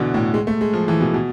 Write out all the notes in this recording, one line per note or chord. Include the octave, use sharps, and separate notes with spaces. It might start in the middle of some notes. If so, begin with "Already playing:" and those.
Already playing: B2 D3 E3
A2
G#3
A3
G#3
F3
E3
B2
B2